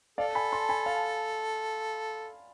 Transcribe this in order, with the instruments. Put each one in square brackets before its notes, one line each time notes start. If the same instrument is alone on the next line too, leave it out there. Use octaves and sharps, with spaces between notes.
[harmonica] A4 [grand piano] D5 F5
[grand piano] G#5 B5
A5 C6
G#5 B5
F5 A5